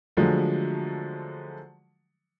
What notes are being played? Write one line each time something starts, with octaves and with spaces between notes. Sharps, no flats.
D3 F3 F#3 G#3 A3